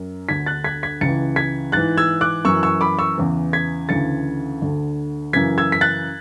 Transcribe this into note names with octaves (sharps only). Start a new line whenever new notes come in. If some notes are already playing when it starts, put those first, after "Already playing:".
Already playing: F#2
D2 D3 G#6 B6
F#6 A6
G#6 B6
G#6 B6
C#2 C#3 E3 A6 C#7
G#6 B6
G#2 E3 F#6 A6
E6 G#6
D6 F#6
F#2 E3 C#6 E6
C#6 E6
B5 D6
C#6 E6
E2 C#3 E3
G#6 B6
D2 C#3 E3 A6 C#7
D2 D3
F#2 C#3 E3 G#6 B6
E6 G#6
B6
F#6 A6